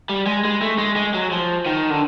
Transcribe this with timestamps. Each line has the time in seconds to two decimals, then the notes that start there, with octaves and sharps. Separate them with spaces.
0.09 G3
0.26 G#3
0.45 G#3
0.61 A3
0.79 G#3
0.96 G#3
1.14 F#3
1.32 F3
1.66 D#3
1.90 D3